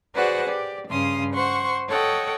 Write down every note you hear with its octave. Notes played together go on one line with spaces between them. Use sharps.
F#4 G#4 B4 C5 D5 F#5
G4 D5
G2 C#3 F5 C6 D#6
C5 F#5 C6 C#6
A4 C#5 D#5 F#5 G5